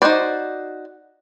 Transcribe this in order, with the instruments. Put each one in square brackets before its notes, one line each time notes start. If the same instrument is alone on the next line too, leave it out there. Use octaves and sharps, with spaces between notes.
[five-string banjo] D#4 E4 F#4 C5 D5